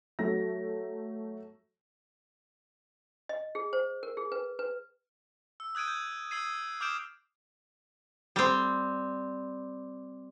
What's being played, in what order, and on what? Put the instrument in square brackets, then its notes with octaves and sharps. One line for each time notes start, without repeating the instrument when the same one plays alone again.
[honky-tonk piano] F#3 A3 A#6
[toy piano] D#5
G#4
C5
A#4
G#4
B4
B4
[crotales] E6
D#6 F#6 G#6 D7 D#7
G6
D#6 E6 G#6 C7 D#7
D6 D#6 F6 G6 D7 E7
[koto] G3 C4